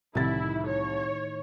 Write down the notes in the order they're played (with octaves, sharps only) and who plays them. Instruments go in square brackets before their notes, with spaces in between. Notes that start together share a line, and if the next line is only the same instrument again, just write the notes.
[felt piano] C2 A6 [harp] A2 D#3 [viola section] E4
[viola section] C#5